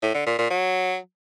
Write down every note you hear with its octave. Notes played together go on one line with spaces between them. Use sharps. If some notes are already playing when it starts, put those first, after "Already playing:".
A2
D3
A#2
A#2
F#3